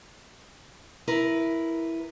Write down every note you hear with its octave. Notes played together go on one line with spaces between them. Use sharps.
E4 A#4 B4